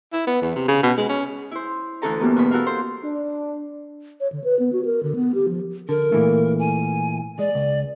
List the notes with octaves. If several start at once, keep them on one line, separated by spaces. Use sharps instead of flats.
E4
B3
E2
C3
C#3
B2
G#3
C#4
E4 C5
D2 E3 C#4 A4 A5 A#5
F#2 G3 A#3 B3
E2 B2 B5
E4 F#4 A4 A#4 F5
C5
D4
C#5
D3
B4
B3
F#4
A#4
D3
B3
G4
F3
D3 A#4
A#2 E3 A3
G#5
G#3 D5
C#2